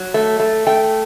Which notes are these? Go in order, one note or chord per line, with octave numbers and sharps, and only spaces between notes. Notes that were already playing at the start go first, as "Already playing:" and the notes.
Already playing: F#3
A3
A3
A3 G5